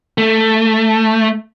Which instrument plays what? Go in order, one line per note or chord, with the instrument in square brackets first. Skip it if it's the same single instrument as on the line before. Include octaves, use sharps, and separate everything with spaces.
[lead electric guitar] A3